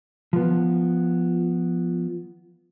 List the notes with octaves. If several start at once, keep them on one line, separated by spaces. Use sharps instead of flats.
F3 B3